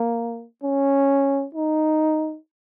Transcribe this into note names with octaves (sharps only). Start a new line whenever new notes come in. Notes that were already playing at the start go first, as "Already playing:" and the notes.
Already playing: A#3
C#4
D#4